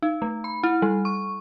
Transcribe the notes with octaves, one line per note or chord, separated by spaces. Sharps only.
D#4
A3
B5
E4
G3
C#6